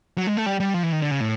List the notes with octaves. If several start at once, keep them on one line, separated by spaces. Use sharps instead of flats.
F#3
G#3
A3
G3
G3
F3
E3
D#3
D3
C#3
A2